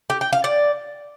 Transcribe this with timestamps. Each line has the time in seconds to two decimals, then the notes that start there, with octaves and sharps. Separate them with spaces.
0.10 G4
0.21 G5
0.33 F5
0.44 D5